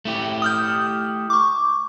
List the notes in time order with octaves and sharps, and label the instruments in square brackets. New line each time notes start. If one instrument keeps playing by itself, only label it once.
[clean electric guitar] A3 E4 G4
[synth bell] D#6 F6 G6
C#6 D6